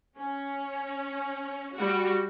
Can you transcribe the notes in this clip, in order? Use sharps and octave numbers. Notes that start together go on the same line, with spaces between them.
C#4
G3 F#4